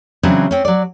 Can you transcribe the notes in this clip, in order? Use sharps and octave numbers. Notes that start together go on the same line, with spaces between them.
C#3 E3 F#3 C4 D4
C4 C#4
F#3 D5